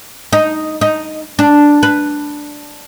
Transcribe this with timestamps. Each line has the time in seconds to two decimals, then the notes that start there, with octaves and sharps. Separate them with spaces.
0.33 D#4
0.81 D#4
1.39 D4
1.83 B4